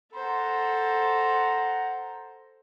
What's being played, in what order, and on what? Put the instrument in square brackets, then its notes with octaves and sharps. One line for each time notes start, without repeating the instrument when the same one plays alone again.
[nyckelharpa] A4 C5 [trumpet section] F#5 A#5